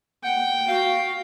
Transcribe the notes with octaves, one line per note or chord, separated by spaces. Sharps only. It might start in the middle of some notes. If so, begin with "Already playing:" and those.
F#5 G5
F#4 F5